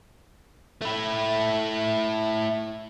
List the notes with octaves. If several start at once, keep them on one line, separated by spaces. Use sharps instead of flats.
A3 E4